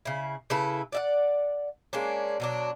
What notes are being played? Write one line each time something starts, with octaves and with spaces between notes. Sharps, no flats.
C#3 E4
C#3 E4 A4 B4
D5 E5 F#5
G#3 A#3 C#4 D4
B2 F#3 D4